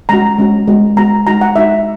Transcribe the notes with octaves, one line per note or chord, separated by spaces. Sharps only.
G#3 C#4 F#4 A#5
G#3 C#4 F#4
G#3 B3 F#4
G#3 B3 F#4 A#5
G#3 D#4 F#4 A#5
F#5
G#3 D#4 F#4 E5